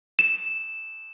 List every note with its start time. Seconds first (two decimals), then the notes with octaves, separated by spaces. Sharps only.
0.19 E7